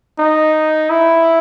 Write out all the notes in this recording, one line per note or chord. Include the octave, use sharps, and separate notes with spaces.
D#4
E4